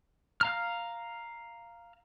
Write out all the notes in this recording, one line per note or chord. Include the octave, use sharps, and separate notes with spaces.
F5 A#5 F6